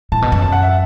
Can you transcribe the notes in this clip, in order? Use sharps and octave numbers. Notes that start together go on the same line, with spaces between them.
A2 A5
B2
F#2 A5
A5
F#5
E5